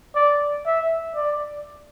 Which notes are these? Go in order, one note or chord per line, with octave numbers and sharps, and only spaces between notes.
D5
E5
D5